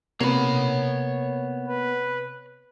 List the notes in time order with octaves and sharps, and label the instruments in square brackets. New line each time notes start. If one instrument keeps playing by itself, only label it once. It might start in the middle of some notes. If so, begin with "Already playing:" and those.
[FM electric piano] C3 [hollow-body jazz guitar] A#3 B3 [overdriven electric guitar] C#5 B5
[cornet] B4